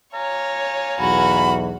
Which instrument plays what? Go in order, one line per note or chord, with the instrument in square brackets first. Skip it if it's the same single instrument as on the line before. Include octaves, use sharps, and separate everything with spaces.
[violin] C#5 [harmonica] F5 G#5 A#5
[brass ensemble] B1 E2 [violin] F#4 [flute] B5